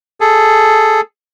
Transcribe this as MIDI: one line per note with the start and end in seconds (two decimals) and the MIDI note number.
0.21 1.01 68
0.21 1.01 69